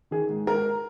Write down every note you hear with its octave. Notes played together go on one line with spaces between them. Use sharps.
D#3 G#4
G#2
G#2 A#4